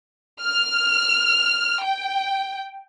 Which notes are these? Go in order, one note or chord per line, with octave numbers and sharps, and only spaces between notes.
F6
G5